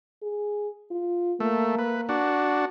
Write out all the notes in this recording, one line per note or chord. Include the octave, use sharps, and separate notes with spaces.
G#4
F4
A3 A#3
B4
D4 F#4